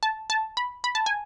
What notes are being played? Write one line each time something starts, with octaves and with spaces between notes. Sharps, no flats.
A5
A5
B5
B5
A5
G#5